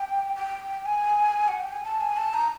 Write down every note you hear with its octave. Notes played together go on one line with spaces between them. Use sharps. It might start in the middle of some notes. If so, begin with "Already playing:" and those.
Already playing: G5
G5
G#5
F#5
G5
G#5
A5
G#5
A5
A#5